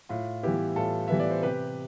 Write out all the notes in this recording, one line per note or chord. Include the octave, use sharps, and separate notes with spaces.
A2 F4
E3 G3 B3 E4 G4
A2 F4 A4
E3 G3 B3 E5
D5
C5
C3 G4 B4